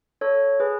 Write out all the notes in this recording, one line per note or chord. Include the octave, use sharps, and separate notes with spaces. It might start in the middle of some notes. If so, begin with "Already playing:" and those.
A4 C#5
G#4 B4